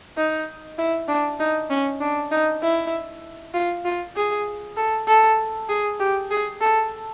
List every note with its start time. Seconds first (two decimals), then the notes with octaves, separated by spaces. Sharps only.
0.17 D#4
0.78 E4
1.08 D4
1.40 D#4
1.70 C#4
2.00 D4
2.31 D#4
2.62 E4
3.54 F4
3.85 F4
4.16 G#4
4.76 A4
5.07 A4
5.69 G#4
5.99 G4
6.30 G#4
6.61 A4